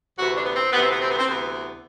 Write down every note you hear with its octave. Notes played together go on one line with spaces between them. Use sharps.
D2 C3 E3 F#4
D4
B3
C4
D2 C3 E3 B3
C4
B3
C4
B3
C4
D2 C3 E3 B3